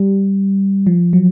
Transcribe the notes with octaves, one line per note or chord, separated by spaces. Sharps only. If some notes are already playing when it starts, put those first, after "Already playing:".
Already playing: G3
F3
F#3